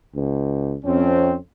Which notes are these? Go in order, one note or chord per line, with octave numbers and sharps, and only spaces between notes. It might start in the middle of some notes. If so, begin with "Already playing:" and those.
C#2
F2 C4 C#4